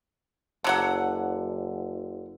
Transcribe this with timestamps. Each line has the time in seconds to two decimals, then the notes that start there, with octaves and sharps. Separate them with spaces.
0.64 F#1 D3 F#3 F#5